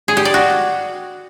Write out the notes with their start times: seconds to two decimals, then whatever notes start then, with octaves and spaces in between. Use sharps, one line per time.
0.08 G#4
0.17 G4
0.25 D5
0.34 F#4